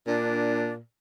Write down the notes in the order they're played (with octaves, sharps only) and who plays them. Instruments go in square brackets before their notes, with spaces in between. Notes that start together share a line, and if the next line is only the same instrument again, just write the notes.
[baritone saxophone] A#2 [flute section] D4